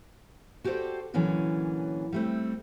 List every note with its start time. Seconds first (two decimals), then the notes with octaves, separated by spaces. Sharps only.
0.64 F#4 G4 A4 A#4 C5 D5
1.14 A#2 D3 E3 F#3 C#4
2.12 G3 A3 C4